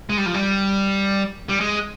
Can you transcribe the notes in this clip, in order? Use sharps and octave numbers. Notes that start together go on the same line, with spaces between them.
G#3
G3
F3
G3
G3
G#3